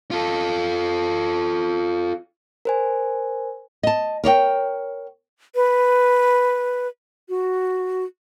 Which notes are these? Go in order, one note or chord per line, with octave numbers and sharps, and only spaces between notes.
F4 A4
A#4 C5 G#5
D#5 A5
A#4 C#5 D5 G5
B4
F#4